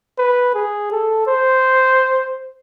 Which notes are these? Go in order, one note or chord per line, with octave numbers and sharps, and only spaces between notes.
B4
G#4
A4
C5